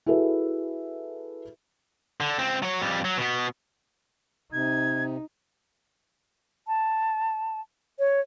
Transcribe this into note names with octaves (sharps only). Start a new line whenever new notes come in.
E4 F#4 G#4 A4 B4 E5
D3
C#2 C4
F#3 C#5
F2 G3
F#3
B2 B3
C3 D#4 G#6
A5
C#5